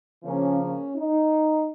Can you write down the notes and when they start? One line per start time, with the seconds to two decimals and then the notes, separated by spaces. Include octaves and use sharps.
0.21 C#3 F3 A#3 C#4
0.58 C#4
0.94 D#4